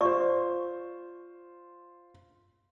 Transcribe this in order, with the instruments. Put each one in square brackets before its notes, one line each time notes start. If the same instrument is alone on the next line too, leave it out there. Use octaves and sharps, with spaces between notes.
[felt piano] F4 C5 [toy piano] D5 C#6